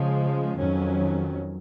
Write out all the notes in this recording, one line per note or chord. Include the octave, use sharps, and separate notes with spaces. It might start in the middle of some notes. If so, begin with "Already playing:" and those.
Already playing: C#3 F3 G#3
F2 D#3 F#3 C#4